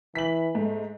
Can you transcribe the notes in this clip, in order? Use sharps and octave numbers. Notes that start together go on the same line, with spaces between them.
E3 B6 F#7
G#2 A3